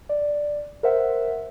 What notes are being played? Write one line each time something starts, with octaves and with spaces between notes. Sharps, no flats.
D5
A#4 C5 E5 F#5